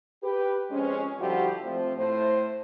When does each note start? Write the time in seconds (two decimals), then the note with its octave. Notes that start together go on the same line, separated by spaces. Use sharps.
0.22 G4 B4
0.71 F2 G#3 C4 C#4
1.19 D3 F3 G3 E4 F#4 G4
1.62 F3 A3 C4
1.97 A2 C5